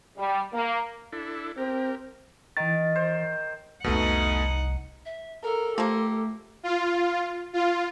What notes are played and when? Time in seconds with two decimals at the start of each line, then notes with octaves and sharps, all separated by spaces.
0.17 G3
0.53 A#3
1.12 D4 E4 A4
1.57 C4 G4 A#4
2.57 D#3 E3 A6
2.96 C5
3.84 F1 C2 B2 A3 D#4 F#5
5.05 E5
5.44 A4 A#4
5.78 F3 A3 A#3 G4
6.63 F4
7.53 F4